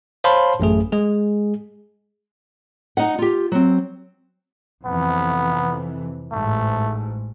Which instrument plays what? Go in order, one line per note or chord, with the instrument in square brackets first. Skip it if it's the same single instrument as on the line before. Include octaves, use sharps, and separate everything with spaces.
[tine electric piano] C5 C#5 F5 A5 B5 C6
A1 F#2 A3 G#4
G#3 G#4
[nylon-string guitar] D#4 D#5 F#5
F4 G4
F#3 C4
[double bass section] F2 C3 E3 [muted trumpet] B3
[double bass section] A1 G#2 [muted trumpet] A3